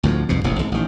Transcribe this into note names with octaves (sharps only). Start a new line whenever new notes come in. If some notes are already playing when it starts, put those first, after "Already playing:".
D2 A2 E3 F3
C2 F2 G#2 B2
E1 A1 C3
G#1
A1 D#3